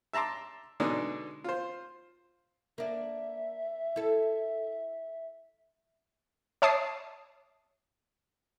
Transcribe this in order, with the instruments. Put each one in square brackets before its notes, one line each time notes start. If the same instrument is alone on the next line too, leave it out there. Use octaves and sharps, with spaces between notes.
[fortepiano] E5 A5 A#5 C6 D6
B2 D3 G#3 D4 D#4
F4 C5
[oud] A#3 D4 [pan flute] E5
[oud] E4 A4
[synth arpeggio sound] C#5 E5 A5 D6 D#6 C7